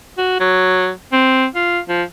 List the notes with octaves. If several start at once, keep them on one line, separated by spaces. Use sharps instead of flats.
F#4
F#3
C4
F4
F3